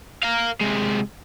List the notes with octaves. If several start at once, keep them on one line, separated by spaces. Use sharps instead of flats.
A#4 F5
C3 G#3